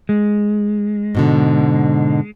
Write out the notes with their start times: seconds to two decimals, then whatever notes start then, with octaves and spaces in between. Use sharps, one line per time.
0.09 G#3
1.15 G#2 B2 D3